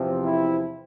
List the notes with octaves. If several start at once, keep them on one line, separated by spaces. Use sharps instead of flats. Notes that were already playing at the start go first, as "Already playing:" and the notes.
Already playing: E2 C3 F3 C4
E4